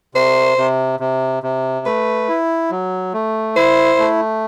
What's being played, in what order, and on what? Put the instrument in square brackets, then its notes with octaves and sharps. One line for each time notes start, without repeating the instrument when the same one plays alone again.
[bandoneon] C3 [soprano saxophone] C5
[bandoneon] C3
C3
C3
[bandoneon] A3 [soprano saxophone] B4
[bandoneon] E4
F#3
A3
[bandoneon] E4 [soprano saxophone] C5
[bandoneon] A3